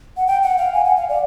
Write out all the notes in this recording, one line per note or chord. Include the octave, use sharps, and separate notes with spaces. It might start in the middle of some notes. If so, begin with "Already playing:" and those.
F#5
G5
F#5
F5
G#5
F#5
F5
D5